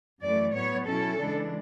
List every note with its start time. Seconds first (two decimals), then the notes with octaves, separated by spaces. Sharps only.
0.22 F#2 E3 A3 D5
0.54 A2 F#3 B3 C#5
0.86 B2 F#3 C#4 E4 A4
1.18 C#3 E3 G#3 D4